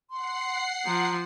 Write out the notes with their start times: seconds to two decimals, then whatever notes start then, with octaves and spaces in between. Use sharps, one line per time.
0.10 F#5 C6 C7
0.86 F3 A#5